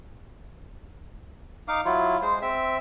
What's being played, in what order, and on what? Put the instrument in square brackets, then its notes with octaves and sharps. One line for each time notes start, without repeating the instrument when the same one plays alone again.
[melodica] D#4 F5 D6
F#3 E4 F4
G#3 C5
C4 E5